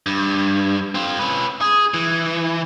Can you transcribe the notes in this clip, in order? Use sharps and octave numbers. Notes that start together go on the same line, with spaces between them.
G2
C4 F4
C#4 B4
G#4
E3